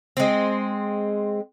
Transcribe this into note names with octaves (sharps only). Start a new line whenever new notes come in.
G#3 C4